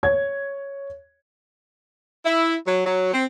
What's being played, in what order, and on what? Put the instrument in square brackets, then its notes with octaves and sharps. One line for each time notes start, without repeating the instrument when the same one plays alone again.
[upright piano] C#5 G#6
[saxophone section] E4
F#3
F#3
C4